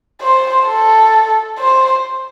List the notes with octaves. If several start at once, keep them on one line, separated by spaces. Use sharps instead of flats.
C5
A4
C5